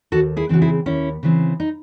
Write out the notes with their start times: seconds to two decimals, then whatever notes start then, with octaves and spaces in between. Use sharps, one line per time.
0.12 D#2 F#4 A4
0.37 E4 G#4
0.49 C#3 E3 C4 F#4
0.62 E4 G#4
0.86 D#2 C#4 E4
1.23 C#3 E3 C4
1.60 D#4